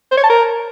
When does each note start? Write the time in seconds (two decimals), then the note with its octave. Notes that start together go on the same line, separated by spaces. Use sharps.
0.12 C5
0.18 C#5
0.24 A5
0.30 A#4